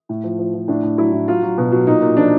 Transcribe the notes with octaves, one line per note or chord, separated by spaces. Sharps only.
A2
F3
F3
F3
A2 D4
A2
F#3 E4
A2
F#3 F4
F#3
B2
F#3
A#2 D#4
A#2
F3 D4